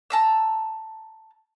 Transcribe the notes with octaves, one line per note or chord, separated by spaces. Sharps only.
A5 A#5 E6